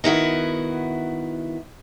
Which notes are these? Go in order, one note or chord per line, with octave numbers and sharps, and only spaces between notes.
D#3 B3 E4 F#4